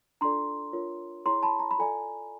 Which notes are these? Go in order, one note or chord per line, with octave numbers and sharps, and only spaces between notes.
D4 F4 A4 D5 A#5 C6
D4 F4 A#4 C#5
E4 G#4 C#5 A#5 C6
A5 B5
A#5
B5
F4 A4 D5 G#5 A#5